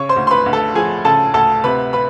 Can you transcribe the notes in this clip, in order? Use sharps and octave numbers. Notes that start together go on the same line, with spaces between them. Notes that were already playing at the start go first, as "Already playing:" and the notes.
Already playing: C#3 C#5 C#6
C5 C6
D2
C6
B4 B5
D2
A4 A5
F3 G#4 G#5
C#3 A4 A5
D2 A4 A5
C3 B4 B5
B4 B5